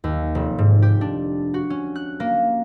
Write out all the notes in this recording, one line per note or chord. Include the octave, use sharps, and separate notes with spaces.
D#2
F1
G#2
G4
D4
F#4
C#4
F#6
A#3